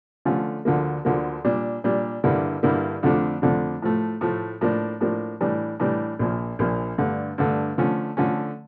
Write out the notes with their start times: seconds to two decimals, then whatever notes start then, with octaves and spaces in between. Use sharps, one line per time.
0.25 D3 F3 A3 C#4 F4
0.65 D2 D3 F3 A#3
1.05 D2 D3 F3 A#3
1.44 A#2 G3 D4
1.84 A#2 G3 D4
2.24 G2 D3 G3 A#3 E4
2.63 G2 D3 G3 A#3 E4
3.03 F2 D3 F3 A3 D4
3.42 F2 D3 F3 A3 D4
3.82 A2 F3 A3
4.21 A2 F3 A3
4.61 A2 F3 A#3 D4
5.01 A2 F3 A#3 D4
5.41 A2 E3 G3 D4
5.80 A2 E3 G3 D4
6.19 A#1 A#2 F3
6.59 A#1 A#2 F3
6.98 G2 D3 A3
7.38 G2 D3 A3
7.78 D3 F3 A3 C#4
8.17 D3 F3 A3 C#4